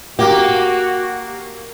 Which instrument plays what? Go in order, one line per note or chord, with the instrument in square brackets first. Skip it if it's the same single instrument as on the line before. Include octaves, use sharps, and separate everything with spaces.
[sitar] A#3 [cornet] F#4 [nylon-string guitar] G4